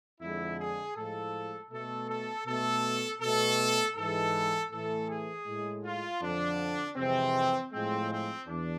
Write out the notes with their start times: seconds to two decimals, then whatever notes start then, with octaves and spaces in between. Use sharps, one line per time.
0.21 F2 D3 G#3 E4
0.59 G#4
0.96 A2 F3 G#3 A4
1.71 B2 A3 A4
2.08 A4
2.46 B2 A3 A4
3.21 B2 A3 A4
3.96 G#2 E3 G#3 A4
4.71 A2 E3 A3 A4
5.09 G#4
5.46 A2 G#3
5.85 F4
6.21 F2 D3 F3 D4
6.96 F2 C3 E3 G#3 C4
7.72 A2 F3 G#3 C4
8.10 C4
8.47 E2 D4